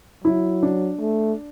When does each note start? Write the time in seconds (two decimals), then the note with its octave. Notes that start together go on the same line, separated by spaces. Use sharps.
0.25 F#3 E4
0.63 D4
1.00 A3